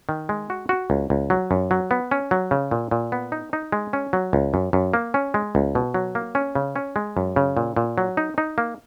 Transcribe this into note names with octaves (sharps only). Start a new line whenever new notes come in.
D#3
G#3
F#4
F#4
C#2
C#2
F#3
F#2
F#3
B3
C#4
F#3
C#3
A#2
A#2
B3
D#4
D#4
G#3
C#4
F#3
C#2
F#2
F#2
A#3
C#4
G#3
C#2
B2
F#3
A#3
C#4
C#3
C#4
G#3
F#2
C#3
A#2
A#2
F#3
D#4
D#4
A#3